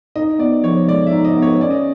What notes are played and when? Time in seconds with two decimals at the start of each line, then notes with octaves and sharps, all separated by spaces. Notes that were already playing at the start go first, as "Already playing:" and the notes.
0.16 D#4 D#5
0.39 B3 D5
0.63 F3 C#5
0.88 G#3 D5
1.06 E5
1.13 D#4
1.25 D#5
1.36 B3
1.42 C#5
1.61 C#4 D5
1.71 D#5